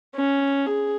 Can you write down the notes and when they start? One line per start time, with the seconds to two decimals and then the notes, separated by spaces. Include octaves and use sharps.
0.15 C#4
0.66 G#4